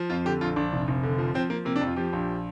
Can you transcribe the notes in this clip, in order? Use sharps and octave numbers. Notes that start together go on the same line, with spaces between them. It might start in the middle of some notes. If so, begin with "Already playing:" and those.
Already playing: F3
F2 F4
D3 G4
A#1 F4
A#1 D4
F1
F1
D3
F3
F3 C4
F3 A#3
C3 A#3
D4
F2
F4
F3 G4
A#1